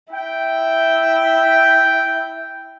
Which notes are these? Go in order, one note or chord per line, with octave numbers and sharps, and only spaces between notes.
E4 G5